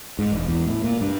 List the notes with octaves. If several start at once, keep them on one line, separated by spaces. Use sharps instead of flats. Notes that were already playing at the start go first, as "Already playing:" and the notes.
G#2
E1
E2
A2
A#2
G2